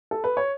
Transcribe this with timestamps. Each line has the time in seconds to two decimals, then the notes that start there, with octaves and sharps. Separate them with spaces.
0.11 A4
0.24 B4
0.37 C#5